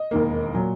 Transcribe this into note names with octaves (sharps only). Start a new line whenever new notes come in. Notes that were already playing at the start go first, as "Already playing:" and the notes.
Already playing: D#5
E1 D#2 D#3 A#3
A#2 F#3